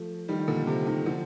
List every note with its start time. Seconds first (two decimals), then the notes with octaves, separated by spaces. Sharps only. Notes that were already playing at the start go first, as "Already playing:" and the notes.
Already playing: F3 A3
0.28 D#3 G3
0.40 D#3
0.47 A#2 D3
0.67 C3
0.86 C3 D#3
1.06 D3 F3